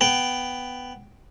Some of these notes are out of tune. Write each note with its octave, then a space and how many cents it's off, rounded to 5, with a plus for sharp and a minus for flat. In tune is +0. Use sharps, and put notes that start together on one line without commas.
B3 +5 G5 +0